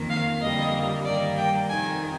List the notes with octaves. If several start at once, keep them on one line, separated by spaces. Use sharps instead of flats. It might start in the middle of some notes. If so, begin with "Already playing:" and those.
Already playing: F2 D#3 A#3
F5
F2 D3 G3 A#3 D#5
G2 D#3 G3 A#3 D5
G5
F2 C3 D#3 G#5